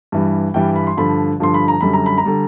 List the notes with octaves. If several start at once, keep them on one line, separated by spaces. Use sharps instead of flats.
G2 E3 G3
G2 E3 G3 G5
B5
C6
G2 D3 F3 B5
G2 D3 F3 C6
B5
A#5
F#2 D3 G3 B5
A#5
B5
A#5
D3 G3